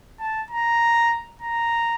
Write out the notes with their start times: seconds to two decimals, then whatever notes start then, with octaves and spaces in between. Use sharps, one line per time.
0.20 A5
0.51 A#5
1.41 A#5